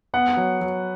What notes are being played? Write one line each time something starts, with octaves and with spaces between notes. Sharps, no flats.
B3 F#5
F#3
F#3